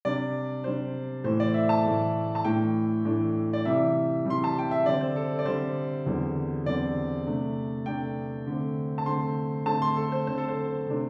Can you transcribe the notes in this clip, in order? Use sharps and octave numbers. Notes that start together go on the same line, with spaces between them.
C3 G3 D4 D5
C3 G3 D4 C5
A2 E3 A3 C5
D5
E5
A5
A2 E3 A3
A5
A2 E3 A3 D4 G5
A2 E3 A3 D4
D5
C3 E3 G3 E5
C3 E3 G3 C6
A5
G5
E5
D3 G3 C4 D5
C5
A4
D5
D3 G3 C4 C5
E2 D3 G3 C4
E2 D3 G3 C4 D5
C3 A3 D4
C3 A3 D4 G5
D3 A3 C4
A5
D3 A3 C4 C6
D3 A3 C4 A5
C6
A4
C5
D3 A3 C4 C5
A4
C5
C3 A3 D4